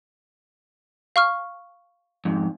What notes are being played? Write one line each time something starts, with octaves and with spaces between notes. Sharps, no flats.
F5 C#6 F6
F2 G#2